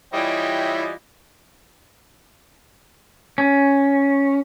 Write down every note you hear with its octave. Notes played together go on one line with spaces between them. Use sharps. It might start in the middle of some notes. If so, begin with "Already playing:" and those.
E3 G3 E4 F4 C#5 D#5 G5
C#4